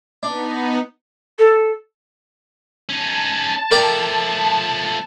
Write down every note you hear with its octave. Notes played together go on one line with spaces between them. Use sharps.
B3 D4 D#4
A4
C#4 D#4 A5
F3 A3 A#4 D5 G5